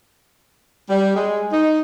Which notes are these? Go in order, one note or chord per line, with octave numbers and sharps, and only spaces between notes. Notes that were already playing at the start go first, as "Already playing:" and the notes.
G3
G#3
D#4